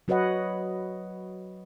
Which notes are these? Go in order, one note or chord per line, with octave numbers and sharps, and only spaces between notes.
F#3 F#4 B4 C#5 D#5 F#5